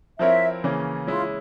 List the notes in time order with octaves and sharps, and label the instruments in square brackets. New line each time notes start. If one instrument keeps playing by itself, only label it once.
[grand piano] F3 C4 E4 A#4 C#5 [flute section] E5
[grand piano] C#3 E3 A#3 C#4
[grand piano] G#3 C#4 E4 [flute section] F4